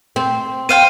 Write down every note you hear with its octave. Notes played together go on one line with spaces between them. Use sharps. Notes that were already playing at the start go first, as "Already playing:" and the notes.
C4
C5 F5 G5 D#7